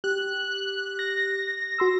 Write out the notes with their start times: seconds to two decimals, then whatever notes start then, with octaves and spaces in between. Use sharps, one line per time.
0.04 G4 F#6
0.99 A#6
1.78 F#4 C6 E6